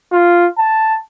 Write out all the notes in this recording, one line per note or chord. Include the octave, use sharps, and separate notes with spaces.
F4
A5